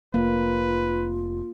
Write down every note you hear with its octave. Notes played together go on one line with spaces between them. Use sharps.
F1 A#3 F4 B4